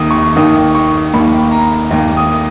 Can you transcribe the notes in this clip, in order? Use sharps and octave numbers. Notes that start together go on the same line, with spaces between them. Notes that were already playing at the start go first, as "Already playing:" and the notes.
Already playing: D#2 D#3 A#3 D#6
C#6
D#2 D#3 A#3 D#6
C#6
D#2 D#3 A#3 B5
A#5
D#2 D#3 A#3
D#6